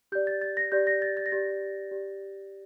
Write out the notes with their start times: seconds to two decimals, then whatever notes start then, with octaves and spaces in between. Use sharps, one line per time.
0.12 G4 G6
0.15 D5
0.27 A6
0.41 A6
0.57 A#6
0.72 G4 D5 G6
0.87 A#6
1.02 A6
1.17 A6
1.26 A#6
1.32 G4 D5 A6
1.91 G4 D5